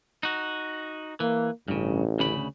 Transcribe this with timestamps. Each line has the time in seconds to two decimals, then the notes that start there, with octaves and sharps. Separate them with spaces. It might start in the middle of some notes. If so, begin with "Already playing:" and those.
0.23 D#4 F#4
1.20 E3 A#3
1.68 A1 G2 C#3
2.19 D2 C#3 B5